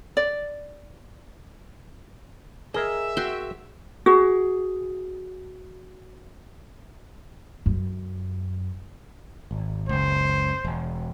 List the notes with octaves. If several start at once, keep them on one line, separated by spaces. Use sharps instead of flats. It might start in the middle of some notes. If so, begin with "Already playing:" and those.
D5
G#4 A#4 D#5 E5
F#4 G5 C6
F#4 G#4
F#2
G#1
F#1 C#2 C5
E1